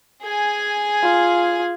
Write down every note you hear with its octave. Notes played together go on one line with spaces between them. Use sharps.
G#4 G#5
F4